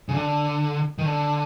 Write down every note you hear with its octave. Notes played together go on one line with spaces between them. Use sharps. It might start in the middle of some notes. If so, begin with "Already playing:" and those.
C#3
D3
D#3
D3